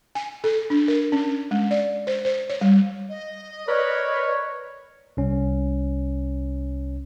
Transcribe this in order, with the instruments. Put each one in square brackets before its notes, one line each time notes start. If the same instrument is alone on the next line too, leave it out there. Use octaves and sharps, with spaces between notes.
[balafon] G#5
A4
D4
A#4
C#4
G#3
D5
C5
C5
C#5
G3
[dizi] D#5
[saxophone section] A#4 B4 [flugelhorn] C#5 [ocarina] D5
[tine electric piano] C2 C#4